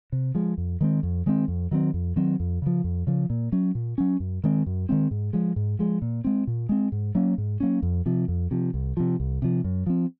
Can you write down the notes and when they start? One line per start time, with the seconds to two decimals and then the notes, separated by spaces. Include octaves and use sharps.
0.12 C3
0.35 F3 G#3
0.58 F2
0.81 D#3 G#3 C4
1.03 F2
1.26 D#3 G#3 C4
1.48 F2
1.71 D#3 F#3 C4
1.94 F2
2.16 D#3 F#3 C4
2.40 F2
2.62 C#3 F3
2.84 F2
3.07 C#3 F3
3.30 A#2
3.52 F#3 C#4
3.75 A#2
3.98 F#3 C#4
4.20 F#2
4.44 D#3 G#3 C4
4.66 F#2
4.89 D#3 G#3 C4
5.11 G#2
5.33 F3 G#3
5.56 G#2
5.79 F3 G#3
6.02 A#2
6.24 G#3 C4
6.47 A#2
6.69 G#3 C4
6.92 G#2
7.15 F#3 A#3 C#4
7.38 G#2
7.60 F#3 A#3 C#4
7.82 F2
8.06 C3 F3
8.28 F2
8.51 C3 F3
8.74 C2
8.97 C3 F3
9.20 C2
9.42 C3 F3
9.64 F#2
9.86 F3 C4